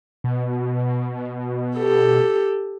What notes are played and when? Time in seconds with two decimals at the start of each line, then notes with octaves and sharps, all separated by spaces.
0.24 B2
1.77 G4 A4